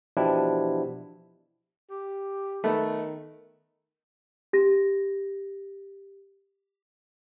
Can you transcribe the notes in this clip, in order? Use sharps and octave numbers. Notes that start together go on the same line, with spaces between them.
B2 E3 F3 D4 E4 G4
G4
D#3 A3 B3
G4 A#6